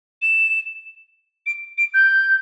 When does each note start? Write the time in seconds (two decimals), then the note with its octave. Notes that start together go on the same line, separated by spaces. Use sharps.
0.22 E7
1.46 D7
1.78 D7
1.94 G6